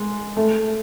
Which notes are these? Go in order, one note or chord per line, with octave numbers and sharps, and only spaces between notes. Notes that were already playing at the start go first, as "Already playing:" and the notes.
Already playing: G#3
A3